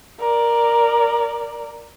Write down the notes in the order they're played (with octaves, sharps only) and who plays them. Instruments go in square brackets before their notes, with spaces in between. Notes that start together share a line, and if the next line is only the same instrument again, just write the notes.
[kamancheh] A#4 D5